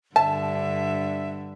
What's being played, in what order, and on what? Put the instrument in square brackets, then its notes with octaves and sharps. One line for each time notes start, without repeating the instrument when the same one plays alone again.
[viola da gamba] G2 D3 [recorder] E5 [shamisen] A5